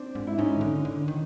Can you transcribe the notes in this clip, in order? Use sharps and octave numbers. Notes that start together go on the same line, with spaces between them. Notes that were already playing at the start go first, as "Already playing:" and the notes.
Already playing: C4 D4
G#2
E4
G#2 C#4 D#4
D#3
D3
D3
D#3